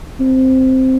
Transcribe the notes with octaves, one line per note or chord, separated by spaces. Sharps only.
C4